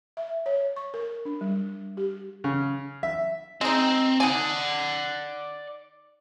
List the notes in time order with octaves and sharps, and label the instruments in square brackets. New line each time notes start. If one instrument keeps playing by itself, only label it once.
[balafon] E5
C#5
C#6
A#4
D4
G3
G4
[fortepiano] C#3
E5
[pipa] G#3 D#4 [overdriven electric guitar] C4
[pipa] D#4 G#5 [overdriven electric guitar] D5 F#5